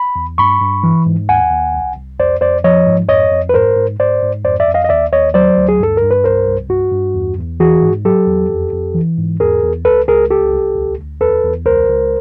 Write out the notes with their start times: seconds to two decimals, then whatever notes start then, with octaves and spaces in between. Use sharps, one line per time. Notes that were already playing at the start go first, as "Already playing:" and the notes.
Already playing: B5
0.16 E2
0.38 G2 B5 C#6
0.61 G2
0.83 E3
1.06 G#2
1.29 D#2 F#5 G#5
1.51 D#2
1.74 C2
1.96 C2
2.19 F2 C5 D5
2.41 F2 C5 D5
2.64 F3 C#5 D#5
2.87 G#2
3.09 F2 C#5 D#5
3.32 F2
3.49 B4
3.54 G#2 A#4 C5
3.76 G#2
3.99 G#2 C5 D5
4.22 G#2
4.44 F2 C5 D5
4.60 D5 E5
4.67 F2
4.74 D#5 F5
4.85 D#5
4.89 D#2 D5 E5
5.12 D#2 C#5 D#5
5.34 F#3 C5 D5
5.57 D2
5.69 G#4
5.80 G2 A4
5.97 A#4
6.02 G2
6.11 B4
6.24 C2 A#4 C5
6.47 C2
6.69 G2 F#4
6.92 G2
7.14 E2
7.38 E2
7.60 E3 F#4 G#4
7.82 G#2
8.05 F#3 G4 A4
8.27 E2
8.50 F2
8.73 F2
8.95 E3
9.18 G#2
9.40 E2 G#4 A#4
9.63 E2
9.85 C#2 A4 B4
10.08 C#2 G#4 A#4
10.30 C2 G4 A4
10.53 C2
10.75 D2
10.98 D2
11.21 E2 A4 B4
11.44 E2
11.66 C#2 A#4 C5
11.88 C#2